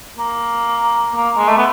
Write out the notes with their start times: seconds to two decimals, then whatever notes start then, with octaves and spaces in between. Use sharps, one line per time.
0.18 A#3
1.16 A#3
1.37 G#3
1.48 A3
1.58 B3